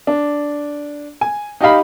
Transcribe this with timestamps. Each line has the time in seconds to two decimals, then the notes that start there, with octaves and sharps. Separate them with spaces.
0.07 D4
1.21 G#5
1.61 D#4 G4 D#5 F5 B5